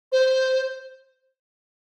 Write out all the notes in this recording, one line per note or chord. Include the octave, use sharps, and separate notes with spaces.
C5